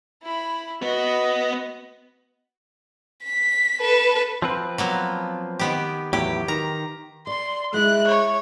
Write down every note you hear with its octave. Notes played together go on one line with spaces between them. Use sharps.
E4 B5
B3 F#4 B4 D#5
B6
A4 B4
F3 C4 B4
F#3 A#3 B3
D#3 B3 G4
E2 A2 F#3 G4
D#3 A#5
D5 C6
G#3 E4 D#5 E5 F#6
C#5